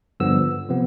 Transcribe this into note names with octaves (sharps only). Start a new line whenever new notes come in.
G2 D3 F3 B3 E6
C3 F3 B3